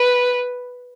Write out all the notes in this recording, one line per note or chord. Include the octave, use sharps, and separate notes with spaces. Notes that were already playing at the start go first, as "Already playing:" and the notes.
Already playing: B4